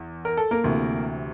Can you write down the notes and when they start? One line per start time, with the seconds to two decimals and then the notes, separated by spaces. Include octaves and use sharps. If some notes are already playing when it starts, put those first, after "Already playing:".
Already playing: E2
0.25 A#4
0.37 A4
0.51 A#3 A#4
0.64 D2 C3 E3